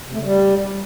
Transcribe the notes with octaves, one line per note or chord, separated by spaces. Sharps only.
C3
A3
C#3
G3